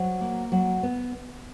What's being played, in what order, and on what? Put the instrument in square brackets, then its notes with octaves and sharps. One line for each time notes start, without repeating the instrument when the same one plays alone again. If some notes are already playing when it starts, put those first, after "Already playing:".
Already playing: [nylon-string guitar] F#3 C5
A#3
F#3
B3